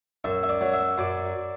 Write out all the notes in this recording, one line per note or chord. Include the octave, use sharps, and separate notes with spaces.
F#2 E5
E5
D5
F#3
E5
F#2 D5